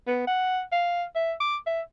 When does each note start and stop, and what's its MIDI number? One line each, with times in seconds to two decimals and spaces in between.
0.07 0.23 59
0.27 0.61 78
0.72 1.04 77
1.15 1.33 76
1.40 1.57 86
1.66 1.81 76